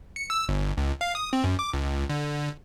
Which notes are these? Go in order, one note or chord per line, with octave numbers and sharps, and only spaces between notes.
C#7
E6
G1
C#2
F5
D#6
C4
F#2
D6
C#2
D3